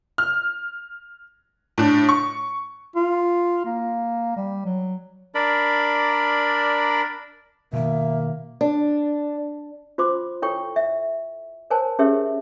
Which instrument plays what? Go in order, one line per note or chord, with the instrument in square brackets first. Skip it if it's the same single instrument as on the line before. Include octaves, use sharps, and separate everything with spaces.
[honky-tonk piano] F6
A2 D4
C#6
[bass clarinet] F4
A#3
G3
F#3
[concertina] D4 A#4 D5 B5
[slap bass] B2 D#3 [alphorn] A#3 [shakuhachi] E5
[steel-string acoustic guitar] D4
[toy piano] F4 C5 C6 D6
E4 A4 C#5 G5 C#6
E5
A#4 C5 C#5 G#5 A5
C#4 G4 G#4 A#4 C#5 E5